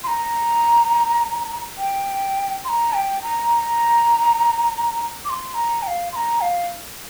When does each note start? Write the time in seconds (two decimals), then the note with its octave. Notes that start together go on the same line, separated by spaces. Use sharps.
0.04 C6
0.07 A#5
1.78 G5
2.64 C6
2.69 A#5
2.93 G5
3.22 A#5
5.25 D6
5.30 C6
5.54 A#5
5.83 G5
5.87 F5
6.12 C6
6.16 A#5
6.41 F5